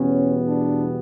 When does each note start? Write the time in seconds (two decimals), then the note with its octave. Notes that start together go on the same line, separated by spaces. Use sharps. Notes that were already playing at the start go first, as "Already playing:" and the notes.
Already playing: E2 B2 G3 B3 C#4
0.46 D4